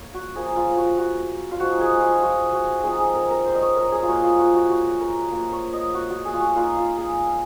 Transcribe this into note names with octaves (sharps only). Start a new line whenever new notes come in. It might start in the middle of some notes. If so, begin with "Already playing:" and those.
Already playing: A#3 C#5
F#4
F3 A#3 F4 G#4
F4
F#4
F#4
F4
F3 G#3 D#4 F#4
G#4
F4
F#4
F#4
F3 C4 D#4 G#4
G#4
A#4
A#4
C5
D#5
C#5
A#4
G#4
F4
F3 A#3 D#4 F#4
F4
F#4
F#4
F#4
A#4
A#3 F4
C#5
D#5
F#4
F#4
G#4
F4
F#4
A#3 D#4 F4
F4
G#4